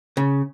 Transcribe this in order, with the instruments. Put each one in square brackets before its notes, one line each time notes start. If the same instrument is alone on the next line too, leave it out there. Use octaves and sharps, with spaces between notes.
[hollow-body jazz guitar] C#3